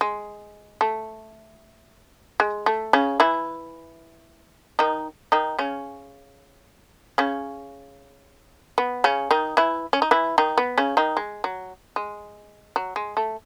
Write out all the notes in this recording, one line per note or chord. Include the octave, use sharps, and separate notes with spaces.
G#3
A3
G#3
A3
C#3 C#4
E3 E4
D#3 D#4
D#3 D#4
C#3 C#4
C#3 C#4
B3
C#3 C#4
D#3 D#4
E3 E4
C#4
D#4
E3 E4
D#3 D#4
B3
C#3 C#4
D#3 D#4
G#3
F#3
G#3
F#3
G#3
A3